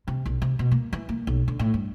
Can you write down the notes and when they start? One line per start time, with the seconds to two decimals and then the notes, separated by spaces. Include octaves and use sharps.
0.08 C3
0.26 B1
0.42 C3
0.59 B2
0.71 A#3
0.93 E3
1.09 A#3
1.27 B1
1.48 D3
1.59 A2
1.74 G2